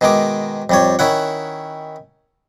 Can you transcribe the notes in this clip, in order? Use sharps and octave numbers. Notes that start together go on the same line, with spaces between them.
B2 D#3 G#3 D6
F2 G3 C#5
D#3 C#4 E4 F#5